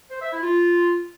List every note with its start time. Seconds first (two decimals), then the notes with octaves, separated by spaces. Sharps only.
0.11 C5
0.21 E5
0.32 E4
0.43 F4